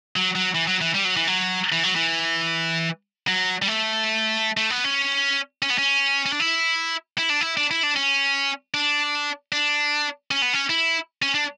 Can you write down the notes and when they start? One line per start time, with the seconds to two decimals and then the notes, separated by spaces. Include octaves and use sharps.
0.16 F#3
0.35 F#3
0.55 E3
0.67 F#3
0.81 E3
0.94 G3
1.05 F#3
1.17 E3
1.27 F#3
1.72 E3
1.83 F#3
1.96 E3
3.28 F#3
3.62 G3
3.68 A3
4.57 A3
4.70 B3
4.84 C#4
5.62 C#4
5.70 B3
5.78 C#4
6.26 C#4
6.33 D4
6.40 E4
7.18 E4
7.30 D4
7.41 E4
7.57 D4
7.71 E4
7.83 D4
7.96 C#4
8.74 D4
9.52 D4
10.31 C#4
10.42 B3
10.53 C#4
10.70 E4
11.22 C#4
11.34 D4